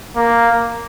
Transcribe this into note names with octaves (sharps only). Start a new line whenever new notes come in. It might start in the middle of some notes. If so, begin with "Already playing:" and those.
A#3